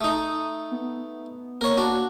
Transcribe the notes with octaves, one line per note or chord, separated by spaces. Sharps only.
A3 D#4 D#6
B3
A#3 A#4 C#5
D4 F#4